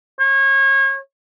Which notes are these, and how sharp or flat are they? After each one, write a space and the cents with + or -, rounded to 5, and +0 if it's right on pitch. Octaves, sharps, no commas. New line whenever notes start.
C#5 -30